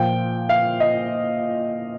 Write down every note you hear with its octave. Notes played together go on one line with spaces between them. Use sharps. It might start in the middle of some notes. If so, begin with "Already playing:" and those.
Already playing: A#2 F3 G5
F5
D#5